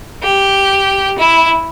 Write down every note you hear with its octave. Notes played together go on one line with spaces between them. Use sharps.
G4
E4